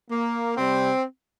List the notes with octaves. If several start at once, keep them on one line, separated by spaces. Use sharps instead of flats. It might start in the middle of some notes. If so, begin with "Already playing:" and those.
A#3
C3 G3 C4